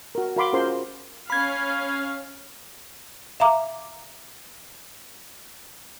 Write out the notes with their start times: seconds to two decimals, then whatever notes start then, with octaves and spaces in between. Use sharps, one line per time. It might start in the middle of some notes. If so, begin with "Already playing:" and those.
0.15 F#4 A#4
0.36 F#4 A#4 F5 B5 C6 D6
0.53 C#4 F4 G#4 A#4 C5 C6
1.30 C#4 F5 B5 G#6
3.40 E5 F5 A#5 D6